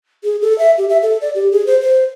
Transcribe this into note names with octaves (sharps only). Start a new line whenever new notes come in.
G#4
A4
E5
G4
E5
A4
D5
G4
G#4
C5
C5